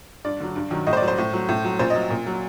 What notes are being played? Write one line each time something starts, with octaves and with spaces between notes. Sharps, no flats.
G2 D5
D3 F#3
G2
D#3 F#3
A2 D#5
C5
D5
F#3
C5
A2
F#3
A2
F#3
A#2 C5
D#5
F#3
A#2
F#3